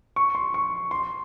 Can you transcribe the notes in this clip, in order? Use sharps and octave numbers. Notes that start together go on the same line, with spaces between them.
C#6
C6
C#6
C6